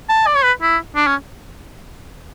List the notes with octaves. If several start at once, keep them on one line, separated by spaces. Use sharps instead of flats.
A5
D5
C#5
B4
E4
D4
C#4